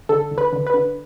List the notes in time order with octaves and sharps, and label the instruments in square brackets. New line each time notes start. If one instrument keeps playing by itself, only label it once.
[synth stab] D3 A4
D2
B4
D3
B4
D3